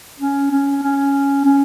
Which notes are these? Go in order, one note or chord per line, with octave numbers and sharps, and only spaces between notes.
C#4
C#4
C#4
C#4